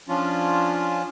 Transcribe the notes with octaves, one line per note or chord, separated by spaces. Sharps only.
F3 C#4 D4 F4